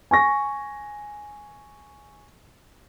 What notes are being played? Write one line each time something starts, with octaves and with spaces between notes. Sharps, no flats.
G#5 C#6 A#6